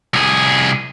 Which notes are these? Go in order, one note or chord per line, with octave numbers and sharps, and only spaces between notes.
C2 G#4